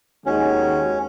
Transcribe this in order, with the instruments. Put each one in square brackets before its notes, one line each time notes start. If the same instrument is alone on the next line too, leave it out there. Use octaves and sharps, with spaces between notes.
[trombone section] D#2 D#3 G#3 F#4 [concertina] C#4